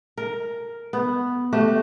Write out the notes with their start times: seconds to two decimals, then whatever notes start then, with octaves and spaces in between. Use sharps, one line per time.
0.18 A#4
0.93 B3
1.53 A3 F#4 G4